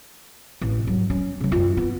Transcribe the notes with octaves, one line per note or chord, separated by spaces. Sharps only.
A1
G#2 F#3
C#4
C#3 F#3
F#2 F4
B3